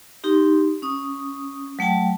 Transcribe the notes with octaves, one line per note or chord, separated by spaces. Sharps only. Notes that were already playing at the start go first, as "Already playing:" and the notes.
D#4 G4 C6
C#4 D#6
F#3 A3 G5 A5